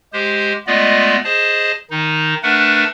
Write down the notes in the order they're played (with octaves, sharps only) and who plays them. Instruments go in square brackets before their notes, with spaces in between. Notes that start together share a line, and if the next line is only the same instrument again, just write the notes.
[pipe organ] G#3 G4 C5
G#3 A3 B3 F4 D5 D#5
G#4 C5 D#5 A5
D#3 D#4
A3 D4 A#4 B4 F#5